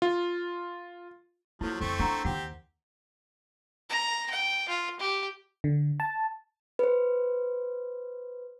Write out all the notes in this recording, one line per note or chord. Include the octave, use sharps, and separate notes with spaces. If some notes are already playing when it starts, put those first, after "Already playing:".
F4
F3 F#3 A#3 E4 A4
F2 D#3 A3 C4 C#6
D4 F#5 A#5
D#2 D#3 C4 G4 F#5
A#5
G5
F4
G4
D3
A5
B4 C5